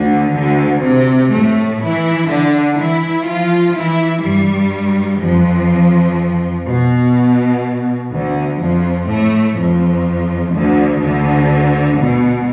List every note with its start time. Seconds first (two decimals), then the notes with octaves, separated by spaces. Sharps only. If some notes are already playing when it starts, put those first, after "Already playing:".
Already playing: D2 D3
0.36 D2 D3
0.85 C3
1.33 A2 A3
1.82 E3 E4
2.30 D3 D4
2.79 E3 E4
3.28 F3 F4
3.76 E3 E4
4.24 G2 G3
5.21 F2 F3
6.67 B2
8.11 D2 D3
8.60 F2 F3
9.09 A2 A3
9.57 F2 F3
10.54 D2 D3
11.02 D2 D3
12.00 B2